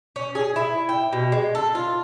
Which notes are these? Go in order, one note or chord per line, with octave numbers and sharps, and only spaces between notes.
C#4
G#4
E4
G5
B2
G#3
A4
F4